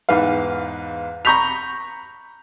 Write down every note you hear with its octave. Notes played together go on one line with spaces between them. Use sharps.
E2 G#2 B4 F5
A#5 B5 C#6 G6 B6 F7